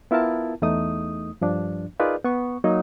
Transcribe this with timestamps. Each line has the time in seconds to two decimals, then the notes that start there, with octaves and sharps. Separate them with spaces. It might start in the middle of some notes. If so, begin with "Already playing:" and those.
0.11 B3 E4 F4 A#4 A5
0.62 E2 A3 D#4 D#6
1.41 G2 F3 D4
2.00 D#4 F4 G#4 A#4 B4 D5
2.24 B3 C#6
2.64 F#3 A#3 D#4